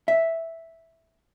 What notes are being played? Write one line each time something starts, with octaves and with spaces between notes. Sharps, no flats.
E5